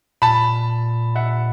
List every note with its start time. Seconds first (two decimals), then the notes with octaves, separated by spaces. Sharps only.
0.22 A#2 A5 B5
1.15 E5 F#5